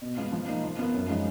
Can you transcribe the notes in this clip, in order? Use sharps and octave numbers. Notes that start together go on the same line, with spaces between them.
B2
G#3 B3 F4
F3
A#3 D#4
F3
B3 F4 A#4
F#2
F3 G#3 D#4